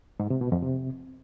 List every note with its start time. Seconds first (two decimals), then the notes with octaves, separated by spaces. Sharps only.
0.20 G#2
0.30 C3
0.41 B2
0.52 F2
0.63 C3